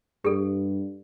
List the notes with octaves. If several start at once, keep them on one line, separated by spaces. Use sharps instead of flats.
G2 G4 A4